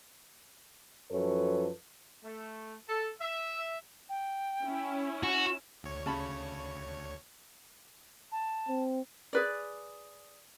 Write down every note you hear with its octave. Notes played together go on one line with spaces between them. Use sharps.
F#2 F3 A4 B4 C#5
A3
A4
E5
G5
C#4 E4
F#4 E7
D2 C#5
C#3 A5 B5
A5
C4
G#4 B4 D5